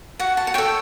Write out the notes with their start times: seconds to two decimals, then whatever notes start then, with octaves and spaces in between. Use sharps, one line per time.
0.19 F#4 F#5
0.37 A5
0.47 F#5
0.54 A4 C#5 G5